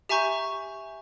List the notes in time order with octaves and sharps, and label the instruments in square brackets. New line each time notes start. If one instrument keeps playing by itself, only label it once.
[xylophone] G4 E5 G#5 A#5 C#6 G6